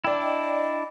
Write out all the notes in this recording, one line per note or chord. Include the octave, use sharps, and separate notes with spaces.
D4 E4 D5 G5
D#5